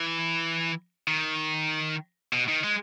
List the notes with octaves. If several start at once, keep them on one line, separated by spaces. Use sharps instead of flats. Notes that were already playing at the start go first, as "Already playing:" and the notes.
Already playing: E3
D#3
B2
D#3
G#3